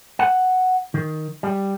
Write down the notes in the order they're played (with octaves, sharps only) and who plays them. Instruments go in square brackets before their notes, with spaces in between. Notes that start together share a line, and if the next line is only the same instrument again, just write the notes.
[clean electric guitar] F#5
D#3
G3